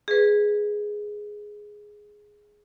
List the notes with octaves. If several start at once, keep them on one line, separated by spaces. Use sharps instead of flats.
G#4 B4